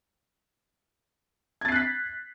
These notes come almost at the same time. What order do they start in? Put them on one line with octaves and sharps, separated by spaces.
G#6 A6 C7 F#6 B6